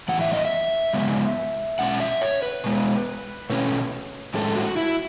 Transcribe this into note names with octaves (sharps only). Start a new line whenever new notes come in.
A2 E3 B3 F#5
E5
D#5
E5
C#3 G#3 B3
B2 G#3 C#4 F#5
E5
C#5
B4
B2 G#3 B3
B2 A3 C#4
A2 G#3 C#4 A4
F#4
E4